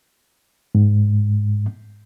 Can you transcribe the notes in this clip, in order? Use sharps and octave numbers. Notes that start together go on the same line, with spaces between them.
G#2